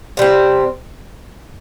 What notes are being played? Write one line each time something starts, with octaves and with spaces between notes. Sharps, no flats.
C3 G3 C4